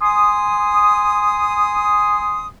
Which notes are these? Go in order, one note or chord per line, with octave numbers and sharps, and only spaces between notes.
G#5 C6 D#6